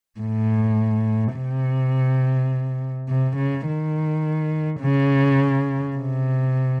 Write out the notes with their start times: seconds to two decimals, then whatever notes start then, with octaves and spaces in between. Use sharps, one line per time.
0.20 A2
1.36 C3
3.09 C3
3.37 C#3
3.67 D#3
4.81 C#3
5.97 C3